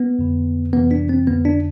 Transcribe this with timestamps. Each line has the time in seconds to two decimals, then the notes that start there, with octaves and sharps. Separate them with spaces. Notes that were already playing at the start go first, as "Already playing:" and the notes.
Already playing: B3
0.19 F2 D3
0.73 F2 C3 E3 B3
0.91 D4
1.09 C4
1.27 F2 D3 B3
1.45 D4